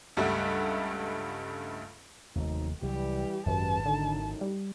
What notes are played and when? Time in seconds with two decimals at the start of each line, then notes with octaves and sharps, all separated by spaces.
0.17 C#2 G2 G3 A3 E5 F#5
2.35 F1 D#2 F#3 A3 C4 D#4
2.82 C2 E3 F#3 G3 G4
3.46 G#1 F#2 G#3 G4 B4 A5
3.85 F#2 A2 D3 D#4
4.41 G3